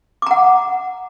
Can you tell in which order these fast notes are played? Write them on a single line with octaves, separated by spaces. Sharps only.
D6 A#5 F#5